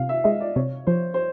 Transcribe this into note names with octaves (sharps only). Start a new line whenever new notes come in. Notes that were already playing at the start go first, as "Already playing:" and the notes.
Already playing: C3 F5
E5
G#3 D#5
D5
C3 C#5
F3 C5
C5